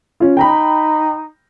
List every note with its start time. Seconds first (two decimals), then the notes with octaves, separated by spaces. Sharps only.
0.20 C#4 F4
0.37 D#4 G5 A#5 B5